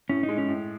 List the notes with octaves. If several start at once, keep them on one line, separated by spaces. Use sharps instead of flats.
A2 C#4
D#4
G#3
C#4
A2